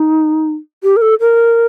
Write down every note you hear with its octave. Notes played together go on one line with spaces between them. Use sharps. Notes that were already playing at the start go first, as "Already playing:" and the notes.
Already playing: D#4
G4
A#4
A4
A#4